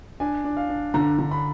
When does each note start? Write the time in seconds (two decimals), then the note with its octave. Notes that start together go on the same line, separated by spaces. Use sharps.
0.20 D4 G#5
0.44 D4
0.57 F5
0.69 D4
0.94 D3 A#5
1.19 D3
1.31 B5